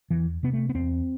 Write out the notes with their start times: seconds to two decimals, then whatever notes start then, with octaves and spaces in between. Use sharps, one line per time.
0.10 E2 E3
0.43 C3 B3
0.53 A3
0.69 B3
0.75 E2 C4